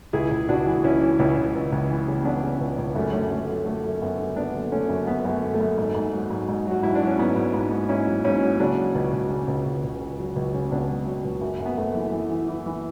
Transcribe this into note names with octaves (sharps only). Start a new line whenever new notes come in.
C#2 E4 G#4
C#2
C#2 D4 F#4
E3
C#2 C#4 E4
E3
C#2 C#4 E4
C#2
C#2
C#2
E3
C#3
E3 B3 D4
C#3
C#2
C#2
F#2 A3 C#4
D3 A3 C#4
D3 A3
F#3
D3 A3
F#2
F#2 B3
D3
F#2 B3 D4
D3
D3 A3 C#4
F#2
F#2 B3
F#2
A3
D3
A3
F#2
G#2
G#2
F#3
G#2
G#2
F#3
F#4
G#2 E4
D4
F#3
C#4
G#2 B3
G#2
G#2
G#2
G#2 C#4 E4
F#3
G#2 C#4 E4
F#3
C#3 D4 F#4
F#3
C#2
C#2
C#3
C#2
C#2
C#2
C#2
F#3
C#2
C#3
C#2 B3 D4
F#3
F#3
C#2
F#2
F#2
B3
F#2 A3
E3
E3
E3
E3
E3